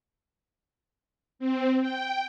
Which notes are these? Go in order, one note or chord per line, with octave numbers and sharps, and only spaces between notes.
C4
G5